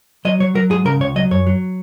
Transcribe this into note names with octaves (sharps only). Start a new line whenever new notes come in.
F#3 D#5
F#3 C#5
F#3 A#4
G#2 G#4
C#3 A#4
C#2 C#5
F#3 D#5
F#2 C#5
F#3